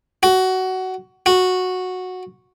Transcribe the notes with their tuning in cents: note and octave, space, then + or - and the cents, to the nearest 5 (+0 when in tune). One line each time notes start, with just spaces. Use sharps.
F#4 +15
F#4 -10